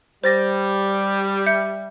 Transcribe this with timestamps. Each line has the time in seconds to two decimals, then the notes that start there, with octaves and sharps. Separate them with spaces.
0.24 G3 C5 A6 A#6
1.46 E5 G6 C#7